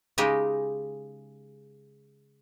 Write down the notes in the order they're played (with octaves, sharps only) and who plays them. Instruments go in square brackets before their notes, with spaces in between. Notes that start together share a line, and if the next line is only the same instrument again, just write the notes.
[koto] C#3 G#3 D#4 G4